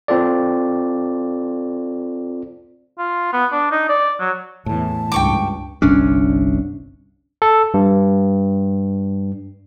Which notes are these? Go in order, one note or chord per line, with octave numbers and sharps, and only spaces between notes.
C4 F4 A4 D5
F4
B3
D4
D#4
D5
F#3
E2 A2 E3 A5
C#2 G2 G5 C#6 D6
G1 C2 C#4 D4
A4
G2